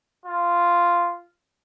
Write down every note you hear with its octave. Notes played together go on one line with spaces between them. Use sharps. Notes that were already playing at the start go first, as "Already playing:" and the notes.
F4